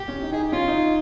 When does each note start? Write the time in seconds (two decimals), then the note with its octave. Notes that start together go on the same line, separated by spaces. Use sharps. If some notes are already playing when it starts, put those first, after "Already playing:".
Already playing: G4
0.08 C#4
0.22 D#4
0.32 D#4 G#4
0.43 G4
0.52 C#4 F4
0.68 D#4